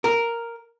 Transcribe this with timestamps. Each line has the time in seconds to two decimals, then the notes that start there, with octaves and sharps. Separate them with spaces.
0.04 A#4